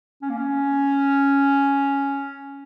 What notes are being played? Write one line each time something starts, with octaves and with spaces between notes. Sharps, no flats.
C#4
A#3
C#4